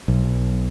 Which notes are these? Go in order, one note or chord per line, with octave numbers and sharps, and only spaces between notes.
B1